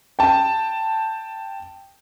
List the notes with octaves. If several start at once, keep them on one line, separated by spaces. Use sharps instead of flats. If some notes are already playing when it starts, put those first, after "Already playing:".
G5 A5